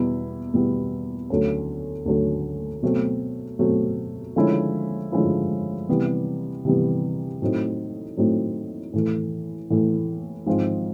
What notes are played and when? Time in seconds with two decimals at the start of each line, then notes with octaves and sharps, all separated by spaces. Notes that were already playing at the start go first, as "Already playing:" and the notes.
Already playing: E2 B2 G3 B3 E4
0.53 E2 B2 G3 B3 E4
1.30 D2 D3 F#3 A3 C#4
2.06 D2 D3 F#3 A3 C#4
2.83 B2 F#3 A3 C4
3.59 B2 F#3 A3 C4
4.36 D3 F3 G#3 C#4 E4
5.12 D3 F3 G#3 C#4 E4
5.89 C3 E3 G3 B3
6.65 C3 E3 G3 B3
7.42 A2 F#3 A3 C4 D#4
8.17 A2 F#3 A3 C4 D#4
8.93 A2 E3 A3
9.70 A2 E3 A3
10.46 G#2 F3 G#3 C4 F4